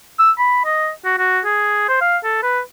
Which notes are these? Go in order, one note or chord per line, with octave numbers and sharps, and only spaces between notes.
E6
B5
D#5
F#4
F#4
G#4
C5
F5
A4
B4